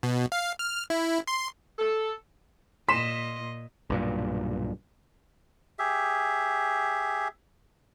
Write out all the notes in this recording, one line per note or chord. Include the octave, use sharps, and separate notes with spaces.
B2
F5
F6
E4
C6
A4
A#2 D#5 C6 B6 E7
B1 G2 A#2
G4 G#4 E5